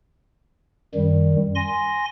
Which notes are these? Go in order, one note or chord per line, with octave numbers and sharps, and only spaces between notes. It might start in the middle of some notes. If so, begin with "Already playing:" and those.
F#2 D#3 G3
G#5 C6 A#6